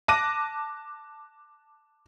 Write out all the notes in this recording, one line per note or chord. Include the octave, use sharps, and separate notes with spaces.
A5 D6 F#6 A#6 D#7